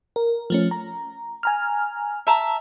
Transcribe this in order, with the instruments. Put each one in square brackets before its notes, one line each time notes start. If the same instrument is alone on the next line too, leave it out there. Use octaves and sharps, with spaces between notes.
[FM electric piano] A#4
F3 A3 C#4
A#5
G#5 A#5 F6
[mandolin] E5 A5 A#5